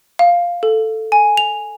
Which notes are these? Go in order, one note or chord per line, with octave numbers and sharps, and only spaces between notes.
F5
A4
G#5
F7